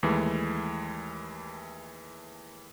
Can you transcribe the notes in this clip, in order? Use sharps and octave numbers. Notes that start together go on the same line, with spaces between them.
D#2 E3 G#3 A3